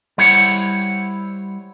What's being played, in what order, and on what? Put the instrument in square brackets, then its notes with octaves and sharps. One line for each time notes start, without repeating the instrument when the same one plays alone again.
[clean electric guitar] G3 E4 C5 C#5 F#5